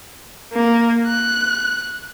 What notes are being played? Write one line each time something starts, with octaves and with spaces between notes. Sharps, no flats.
A#3
F#6